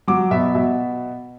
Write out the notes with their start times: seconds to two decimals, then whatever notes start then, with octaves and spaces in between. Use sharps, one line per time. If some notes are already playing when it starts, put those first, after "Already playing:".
0.08 F#3 D6
0.31 B2 E5
0.55 B2 E5